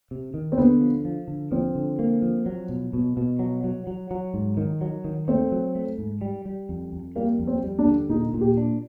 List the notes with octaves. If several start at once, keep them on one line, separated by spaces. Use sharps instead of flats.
C3
D#3
C4
D3 B3
F3
F3
D3
F3 C4
D3
A#3
F3
F#3
B2
B2
B2
F#3
F#3
F#3
F#3
G#2
D#3
F#3
D#3
A3 C4
F#3
A3
G#2
G3
G3
F2
F2
G3 A#3
F2
C4
G3
D4
D3
A#2 D#4
A#2
G4
D4